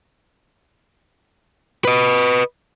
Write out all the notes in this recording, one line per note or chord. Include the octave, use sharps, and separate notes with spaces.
B4 D#5